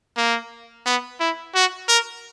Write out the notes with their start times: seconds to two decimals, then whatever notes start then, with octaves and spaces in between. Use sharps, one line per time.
0.17 A#3
0.86 B3
1.20 E4
1.55 F#4
1.88 A#4